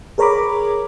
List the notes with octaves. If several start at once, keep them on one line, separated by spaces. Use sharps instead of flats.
G#4 A#4 C#5 A#5 B5 D6